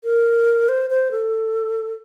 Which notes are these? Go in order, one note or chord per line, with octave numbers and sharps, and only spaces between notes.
A#4
C5
C5
A4